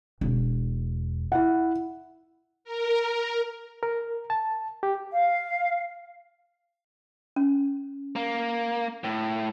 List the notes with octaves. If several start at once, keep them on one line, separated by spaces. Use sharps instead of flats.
E1
E4 F#5
A#4
A#4
A5
G4
F5
C#4
A#3
A2